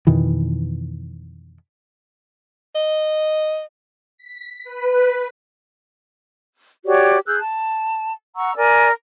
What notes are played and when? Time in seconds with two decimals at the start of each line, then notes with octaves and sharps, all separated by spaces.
0.07 F2 B2 D#3 E3
2.75 D#5
4.17 B6
4.64 B4
6.85 F#4 G4 C#5 D5
7.26 G#4 E6 F#6 G6
7.39 A5
8.36 F#5 A#5 C#6 E6
8.56 A#4 D5 G#5